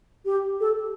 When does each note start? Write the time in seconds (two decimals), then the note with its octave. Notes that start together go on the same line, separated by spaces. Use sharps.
0.25 G4
0.60 A4